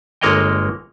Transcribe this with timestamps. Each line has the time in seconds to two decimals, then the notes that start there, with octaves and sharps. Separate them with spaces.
0.21 G1 G#3 A#3 C#5 D#5 G5